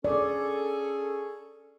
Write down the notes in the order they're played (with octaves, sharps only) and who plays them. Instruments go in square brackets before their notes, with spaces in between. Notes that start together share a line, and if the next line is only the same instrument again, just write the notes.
[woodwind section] C#4 G#4 A4 [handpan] D5